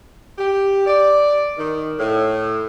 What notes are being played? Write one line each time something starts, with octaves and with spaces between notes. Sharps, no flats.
G4
D5
D#3
A2